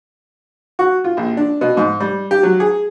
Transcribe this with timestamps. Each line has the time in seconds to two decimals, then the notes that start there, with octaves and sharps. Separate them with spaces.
0.79 F#4
1.04 F4
1.17 A#1
1.37 D4
1.61 B2
1.77 G#2
2.00 G3
2.31 G4
2.43 F#3
2.60 G#4